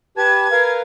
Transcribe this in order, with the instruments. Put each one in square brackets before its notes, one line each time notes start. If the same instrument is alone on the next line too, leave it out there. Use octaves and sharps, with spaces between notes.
[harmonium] G4 B4 A5 [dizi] G#6
[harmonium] A#4 B4 F5